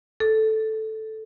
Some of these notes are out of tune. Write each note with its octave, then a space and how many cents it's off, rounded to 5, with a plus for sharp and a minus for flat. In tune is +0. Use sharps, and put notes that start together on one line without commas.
A4 -5